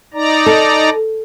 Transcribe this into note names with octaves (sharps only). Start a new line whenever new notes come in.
D#4 D5 A#5
A4